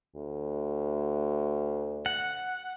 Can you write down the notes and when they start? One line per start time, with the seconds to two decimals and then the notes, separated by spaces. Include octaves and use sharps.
0.16 D2
2.06 F#5